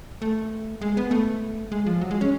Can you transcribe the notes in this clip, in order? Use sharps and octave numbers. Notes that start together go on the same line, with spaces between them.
A3
G#3
B3
A3
G#3
F3
F#3
G#3
C#4